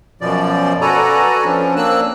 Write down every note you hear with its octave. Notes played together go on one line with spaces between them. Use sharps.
F#2 B2 F3 D5
F#4 A4 B4 D5 G#5 A#5
F3 C#4 D4
A#3 C4 D4 E6 F#6